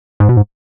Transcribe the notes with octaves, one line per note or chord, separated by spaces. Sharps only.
G#2
B2
G#2